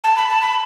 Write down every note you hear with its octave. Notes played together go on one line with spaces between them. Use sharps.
A5
B5
A5
B5